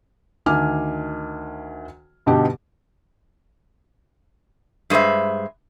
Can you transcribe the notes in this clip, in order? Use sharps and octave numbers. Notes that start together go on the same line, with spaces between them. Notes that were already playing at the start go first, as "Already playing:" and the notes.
D2 D#3 G#5 D6 F6
G2 B2 D3 D#4 G4
G2 G#3 B4 C5 E5